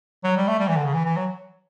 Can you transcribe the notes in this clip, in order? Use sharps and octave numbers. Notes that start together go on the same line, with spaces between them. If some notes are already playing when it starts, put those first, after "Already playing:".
F#3
G3
A3
G3
E3
D3
C#3
E3
E3
F#3